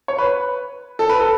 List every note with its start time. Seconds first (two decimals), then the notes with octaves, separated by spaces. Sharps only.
0.08 C#5
0.18 B4
0.99 A4
1.09 B4
1.20 A4